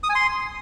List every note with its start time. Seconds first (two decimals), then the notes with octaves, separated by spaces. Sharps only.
0.03 D#6
0.09 G#5
0.15 C6